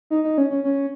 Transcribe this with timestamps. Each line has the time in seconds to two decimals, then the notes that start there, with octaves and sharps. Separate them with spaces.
0.10 D#4
0.24 D#4
0.38 C#4
0.50 C#4
0.64 C#4